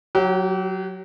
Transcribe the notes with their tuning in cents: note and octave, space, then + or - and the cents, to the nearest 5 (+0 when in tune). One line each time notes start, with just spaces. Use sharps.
F#3 +0 G4 -35